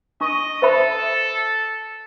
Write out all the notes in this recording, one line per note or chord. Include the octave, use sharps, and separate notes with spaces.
D4 D#5 C#6
A4 C5 E5 B5